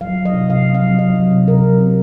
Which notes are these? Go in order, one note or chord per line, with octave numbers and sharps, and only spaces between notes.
F#3 F5
F#3
D#5
C3
C3 F5
C3
F5
F#3
F#3 D#5
F#3
C3
C3 A#4
F#3
C4